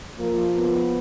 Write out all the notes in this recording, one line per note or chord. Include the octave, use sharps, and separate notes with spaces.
F3 A#3
B3